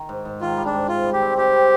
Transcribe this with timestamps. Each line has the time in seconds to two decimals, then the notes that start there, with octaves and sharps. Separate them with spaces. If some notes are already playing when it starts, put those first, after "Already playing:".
Already playing: D#3
0.09 G#2
0.25 G#2
0.41 D#3 F4
0.57 G3
0.65 D4
0.73 G#2
0.89 C3 F4
1.05 G3
1.13 G4
1.22 C4
1.37 C3 G4
1.53 C3